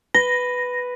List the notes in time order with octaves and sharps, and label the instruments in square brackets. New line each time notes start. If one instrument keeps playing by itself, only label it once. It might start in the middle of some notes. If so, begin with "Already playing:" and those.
[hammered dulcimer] B4 [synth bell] A#6